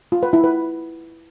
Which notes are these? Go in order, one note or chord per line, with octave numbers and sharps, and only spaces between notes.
F4
B4
E4
B4